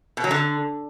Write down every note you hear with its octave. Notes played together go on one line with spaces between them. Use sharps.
B2
F#3
D3